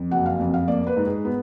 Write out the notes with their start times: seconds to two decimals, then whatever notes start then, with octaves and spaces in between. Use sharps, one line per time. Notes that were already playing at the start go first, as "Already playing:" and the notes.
Already playing: F2
0.11 F#1 F#5
0.26 F5
0.40 F2
0.54 F5
0.68 A#3 D5
0.87 B4
0.97 G#2
1.06 G#4
1.25 B3